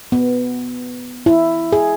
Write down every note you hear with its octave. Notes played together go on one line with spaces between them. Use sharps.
B3
E4
G#4